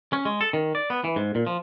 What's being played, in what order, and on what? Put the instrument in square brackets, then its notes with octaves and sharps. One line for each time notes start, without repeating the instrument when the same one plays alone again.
[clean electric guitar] C#4
G#3
A4
D#3
D5
B3
E3
G#2
A#2
F3